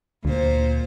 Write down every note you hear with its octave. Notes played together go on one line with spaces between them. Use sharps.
D2 A#2 C5